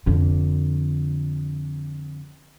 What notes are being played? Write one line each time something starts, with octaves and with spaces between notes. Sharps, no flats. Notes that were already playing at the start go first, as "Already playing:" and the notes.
F2 D3